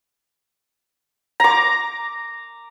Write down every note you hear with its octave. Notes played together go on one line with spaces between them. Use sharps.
A#5 D6